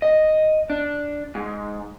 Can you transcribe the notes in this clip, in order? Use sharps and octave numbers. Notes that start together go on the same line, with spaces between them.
D#5
D4
G#2